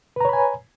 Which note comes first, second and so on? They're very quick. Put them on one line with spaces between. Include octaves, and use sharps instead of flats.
B4 A#5 C#5 B5 G#5